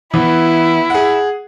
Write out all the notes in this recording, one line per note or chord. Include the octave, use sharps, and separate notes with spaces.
E3 B3 E4
G#4 F#5